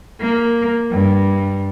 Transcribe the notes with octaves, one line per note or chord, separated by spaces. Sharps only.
A#3
G2